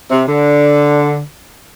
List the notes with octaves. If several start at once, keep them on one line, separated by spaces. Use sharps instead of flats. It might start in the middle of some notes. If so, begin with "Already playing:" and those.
C3
D3